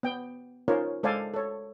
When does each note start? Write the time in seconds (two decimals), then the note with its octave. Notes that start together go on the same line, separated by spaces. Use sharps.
0.03 B3 G5
0.68 C#4 D#4 F4 A#4 C5 C#5
1.03 G#3 A4 C5 D5 F5 G#5
1.34 A4 C#5